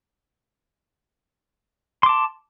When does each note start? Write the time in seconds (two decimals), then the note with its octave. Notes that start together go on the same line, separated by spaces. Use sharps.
2.03 C6
2.06 D6
2.09 A5